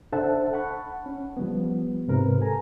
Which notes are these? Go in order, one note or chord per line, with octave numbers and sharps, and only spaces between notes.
D4 A4 C5 E5 F#5 A5
F#5 A5 B5 C#6
C#4
F3 G3 B3
G#2 C3 A#4 B4
A4 G#5 A#5